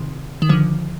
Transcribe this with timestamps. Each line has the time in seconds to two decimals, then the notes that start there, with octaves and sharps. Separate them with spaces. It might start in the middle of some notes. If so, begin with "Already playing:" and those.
Already playing: C3 D#3
0.42 D#3
0.49 D3 F3